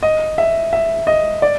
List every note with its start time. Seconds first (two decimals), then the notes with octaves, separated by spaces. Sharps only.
0.03 D#5
0.38 E5
0.73 E5
1.07 D#5
1.42 D5